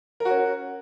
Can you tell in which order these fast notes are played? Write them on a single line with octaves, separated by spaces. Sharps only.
A#4 F#4 C#4